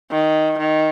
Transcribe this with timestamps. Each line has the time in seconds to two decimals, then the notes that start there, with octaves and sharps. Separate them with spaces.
0.11 D#3
0.58 D#3